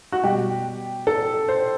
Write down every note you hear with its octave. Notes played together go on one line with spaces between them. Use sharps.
F#4
B2 G3 G4
A4
C5